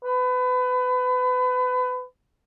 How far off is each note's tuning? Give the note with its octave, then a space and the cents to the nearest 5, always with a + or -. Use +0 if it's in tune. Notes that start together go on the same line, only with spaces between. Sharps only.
B4 +30